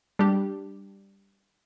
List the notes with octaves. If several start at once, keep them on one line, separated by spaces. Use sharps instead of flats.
G3 D4 G4